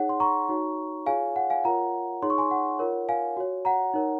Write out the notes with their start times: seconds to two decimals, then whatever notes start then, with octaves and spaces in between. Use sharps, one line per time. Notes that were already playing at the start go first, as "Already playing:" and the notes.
Already playing: D#4 G#4 C#5 F#5
0.09 C6
0.20 A#5 C#6
0.49 D#4 F#4 C#5
1.06 F4 G#4 C#5 F5 G#5
1.36 F#5
1.50 F5 G#5
1.64 F4 A#4 C#5 F#5 A#5
2.22 D#4 G#4 C#5 C6
2.30 C#6
2.38 G#5 C6
2.51 F#5
2.79 F4 A#4 C#5
3.09 F5 G#5
3.37 F#4 C#5
3.65 F#5 A#5
3.94 D#4 A#4 C#5